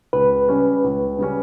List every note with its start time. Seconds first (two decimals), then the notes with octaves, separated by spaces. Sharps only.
0.13 C#2 B4
0.48 C#3 G3 C#4
0.84 C#2
1.19 C#3 G3 C#4